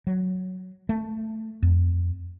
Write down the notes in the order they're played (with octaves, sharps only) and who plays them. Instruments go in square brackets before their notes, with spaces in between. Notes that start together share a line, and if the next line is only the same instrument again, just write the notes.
[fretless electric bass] F#3
A3
F2